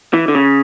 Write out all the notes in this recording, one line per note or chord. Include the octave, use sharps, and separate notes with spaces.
E3
D3
C#3